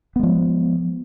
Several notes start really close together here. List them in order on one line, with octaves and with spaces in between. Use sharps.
B3 G#3 F3